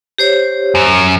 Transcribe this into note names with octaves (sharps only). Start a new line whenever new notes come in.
G4 C5 C#5
F#2